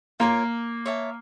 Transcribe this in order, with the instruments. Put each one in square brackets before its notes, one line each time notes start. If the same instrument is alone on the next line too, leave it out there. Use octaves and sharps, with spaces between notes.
[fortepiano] A#3 [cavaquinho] F4 A#4 C#5
[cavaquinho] C#5 E5 A5